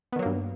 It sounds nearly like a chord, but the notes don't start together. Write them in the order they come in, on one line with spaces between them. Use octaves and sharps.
B3 D#3 F#3 A#3 G2